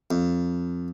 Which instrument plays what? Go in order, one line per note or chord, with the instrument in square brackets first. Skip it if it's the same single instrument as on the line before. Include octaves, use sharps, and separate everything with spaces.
[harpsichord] F2